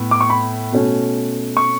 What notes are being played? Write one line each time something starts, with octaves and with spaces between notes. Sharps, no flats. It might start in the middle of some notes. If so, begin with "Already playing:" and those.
Already playing: A2 B3
D6
C#6
B5
B2 A3 C#4
C#6